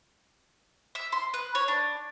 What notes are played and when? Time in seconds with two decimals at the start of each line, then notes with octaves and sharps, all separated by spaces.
0.95 E5
1.12 C6
1.34 B4
1.55 C#5
1.68 D4